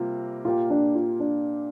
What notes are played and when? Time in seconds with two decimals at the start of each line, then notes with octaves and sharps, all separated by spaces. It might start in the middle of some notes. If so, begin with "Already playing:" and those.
Already playing: C3 G3 A#3 F4
0.45 A#2 A#3 F4 G4
0.70 D4
0.95 F4
1.20 D4